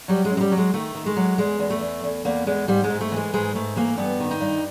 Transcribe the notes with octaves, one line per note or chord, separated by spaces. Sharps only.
F#3 G3
G#3
F#2
G#3
G3
F#3
G#3
D#3 A3
D#3
G#3
F#3
E2 G#3
E2
A3
E2
E2
E2 A#3
E2 G#3
G#2 G3
G#3
G#2
A3
E3 G#3
G#2 G#3
G#2 A3
E3 A#3
G2 B3
D#3
D#4
G2